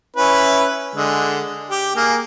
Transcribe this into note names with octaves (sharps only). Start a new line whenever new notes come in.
C#4 E4 B4
D3 G#3
G4
A#3 G#4